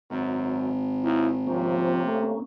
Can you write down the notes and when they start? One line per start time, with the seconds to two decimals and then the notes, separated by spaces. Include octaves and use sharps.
0.10 G#1 F#2
1.04 D#2 E4
1.47 C3 F3 A#3 C#4
2.06 A3